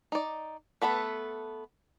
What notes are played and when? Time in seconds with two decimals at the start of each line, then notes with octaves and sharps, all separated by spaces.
0.12 D#4 D5
0.82 A3 B3 A4 B4